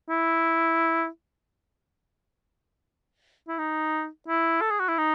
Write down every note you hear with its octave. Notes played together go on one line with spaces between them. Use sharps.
E4
E4
D#4
E4
A4
G#4
F#4
E4
D#4